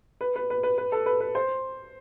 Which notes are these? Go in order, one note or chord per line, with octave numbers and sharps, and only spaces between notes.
B4
B4
B4
B4
B4
A4
B4
B4
C5